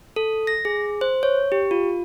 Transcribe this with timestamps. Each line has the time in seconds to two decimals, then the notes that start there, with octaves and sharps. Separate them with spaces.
0.16 A4
0.47 A#6
0.65 G#4
1.01 C5
1.23 C#5
1.52 G4
1.71 F4